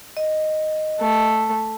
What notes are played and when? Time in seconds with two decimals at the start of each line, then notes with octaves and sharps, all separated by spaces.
0.17 D#5
1.00 A3